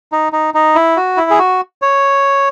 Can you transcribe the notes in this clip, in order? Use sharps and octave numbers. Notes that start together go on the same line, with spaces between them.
D#4
D#4
D#4
E4
F#4
E4
G#4
F#4
C#5